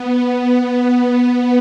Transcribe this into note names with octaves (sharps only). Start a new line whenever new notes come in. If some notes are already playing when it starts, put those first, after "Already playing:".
Already playing: B3